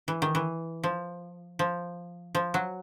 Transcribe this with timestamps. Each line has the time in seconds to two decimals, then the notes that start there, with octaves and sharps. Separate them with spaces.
0.08 E3
0.22 D#3
0.35 E3
0.84 F3
1.59 F3
2.35 F3
2.54 F#3